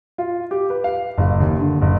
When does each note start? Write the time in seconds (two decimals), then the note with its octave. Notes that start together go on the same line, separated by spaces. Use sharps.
0.18 F4
0.51 G4
0.70 B4
0.84 F5
1.18 F#1
1.40 D#2
1.60 D3
1.82 F#1